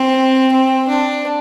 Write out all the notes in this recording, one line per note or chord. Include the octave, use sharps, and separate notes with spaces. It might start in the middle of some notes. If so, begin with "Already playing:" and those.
Already playing: C4
C4
D4